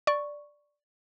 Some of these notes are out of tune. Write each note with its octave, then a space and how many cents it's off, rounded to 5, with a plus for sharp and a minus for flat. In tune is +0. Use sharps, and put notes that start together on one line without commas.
D5 +0 C#6 +0